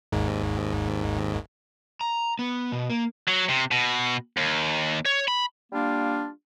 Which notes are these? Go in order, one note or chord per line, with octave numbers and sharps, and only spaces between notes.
G#1 D#2 G#2
A#5
B3
B2
A#3
F#3
C3
B2
D#2
C#5
B5
G3 A#3 D4 F4